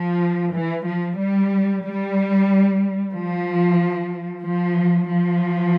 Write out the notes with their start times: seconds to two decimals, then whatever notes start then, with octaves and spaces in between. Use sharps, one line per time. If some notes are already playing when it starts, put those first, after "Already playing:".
Already playing: F3
0.53 E3
0.86 F3
1.18 G3
1.83 G3
3.12 F3
4.42 F3
5.07 F3